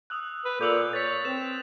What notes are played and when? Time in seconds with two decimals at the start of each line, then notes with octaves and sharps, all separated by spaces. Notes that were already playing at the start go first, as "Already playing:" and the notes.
0.10 D#6 E6 F#6
0.45 B4
0.61 A#2 A4 D6 E6 G6 F7 F#7
0.93 C#5 A6 B6
1.25 C4 B4 E7